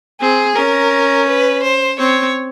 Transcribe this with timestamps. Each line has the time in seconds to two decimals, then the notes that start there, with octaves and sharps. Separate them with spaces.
0.20 C4 G#4
0.56 C#4 A#4
1.28 B4
1.63 C5
1.99 C4 C#5